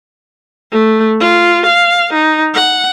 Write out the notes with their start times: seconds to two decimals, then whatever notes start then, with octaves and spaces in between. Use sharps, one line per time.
0.71 A3
1.20 F4
1.66 F5
2.13 D#4
2.54 F#5